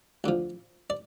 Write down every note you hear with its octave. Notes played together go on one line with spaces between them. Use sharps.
D2 D3 F3
D5